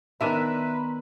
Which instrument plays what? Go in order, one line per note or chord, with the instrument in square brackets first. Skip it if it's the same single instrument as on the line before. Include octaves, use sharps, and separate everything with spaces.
[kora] D#3 D4 A#4 [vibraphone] B3 A#5 C6 [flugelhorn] B4 [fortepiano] E5